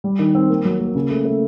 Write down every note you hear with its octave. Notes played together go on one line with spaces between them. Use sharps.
G3
D#3
C4
A#3
F#3
A#3
C#3
A3
A3